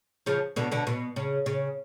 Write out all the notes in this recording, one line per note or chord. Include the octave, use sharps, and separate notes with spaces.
C#3 F3
B2 D3
B2 D3
B2
C#3
C#3